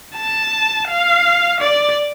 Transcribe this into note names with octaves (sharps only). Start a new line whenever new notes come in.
A5
F5
D5